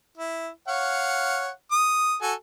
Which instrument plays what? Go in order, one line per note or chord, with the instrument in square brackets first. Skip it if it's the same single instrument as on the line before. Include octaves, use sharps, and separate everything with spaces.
[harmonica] E4
C#5 F5 F#5
D#6
F#4 A4 G#5